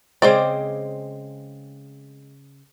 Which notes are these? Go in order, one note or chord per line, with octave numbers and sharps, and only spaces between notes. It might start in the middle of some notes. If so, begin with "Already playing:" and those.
C#3 G#3 C4 C5 D5